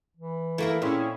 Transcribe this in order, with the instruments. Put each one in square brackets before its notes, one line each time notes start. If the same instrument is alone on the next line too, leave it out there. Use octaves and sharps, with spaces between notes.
[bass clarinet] E3
[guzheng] A3 A#3 A#4 [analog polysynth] E4
[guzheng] A#2 [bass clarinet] C4 [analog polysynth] C#4 E4 G#4